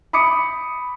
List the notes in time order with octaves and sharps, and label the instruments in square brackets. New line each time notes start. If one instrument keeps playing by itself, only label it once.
[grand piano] B5 D6 D#6 C#7